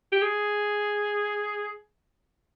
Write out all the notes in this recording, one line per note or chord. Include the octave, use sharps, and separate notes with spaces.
G4
G#4